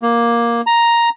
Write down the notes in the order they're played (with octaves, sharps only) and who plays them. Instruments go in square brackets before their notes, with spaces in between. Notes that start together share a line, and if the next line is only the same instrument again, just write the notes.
[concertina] A#3
A#5